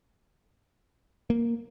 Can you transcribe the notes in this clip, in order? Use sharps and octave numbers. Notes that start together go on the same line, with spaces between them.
A#3